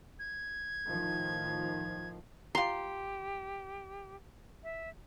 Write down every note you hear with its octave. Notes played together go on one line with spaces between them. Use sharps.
G#6
A2 D#3 F3
F4 G4 A#5 C6
E5